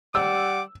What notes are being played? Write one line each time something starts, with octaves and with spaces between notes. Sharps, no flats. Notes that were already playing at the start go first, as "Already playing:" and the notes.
G3 F#5 D6 E6